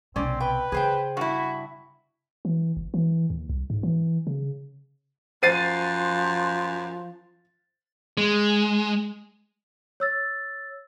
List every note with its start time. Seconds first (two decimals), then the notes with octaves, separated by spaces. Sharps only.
0.16 B1 C3 C4 C#4 D5
0.40 B4 G5
0.72 C#3 G#4 C5 G5
1.17 G2 E4 F#4
2.45 E3
2.77 F#1
2.94 E3
3.30 D#2
3.49 C2
3.70 G#2
3.83 E3
4.27 C#3
5.43 F#2 F3 C5 A6 C7 D#7
8.17 G#3
10.00 C#5 E6 A6